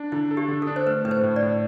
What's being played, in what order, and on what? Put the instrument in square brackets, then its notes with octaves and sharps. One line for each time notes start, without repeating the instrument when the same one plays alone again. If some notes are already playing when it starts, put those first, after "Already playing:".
Already playing: [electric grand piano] D4
[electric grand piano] D3 [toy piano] E4
[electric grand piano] A4
[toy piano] G4
[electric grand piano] D3
[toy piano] A4
[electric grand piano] D4
[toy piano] C5
[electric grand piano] A3 [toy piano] B4
[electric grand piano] A2 [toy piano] B4
[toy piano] C5
[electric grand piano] A2
[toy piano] D5
[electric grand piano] A2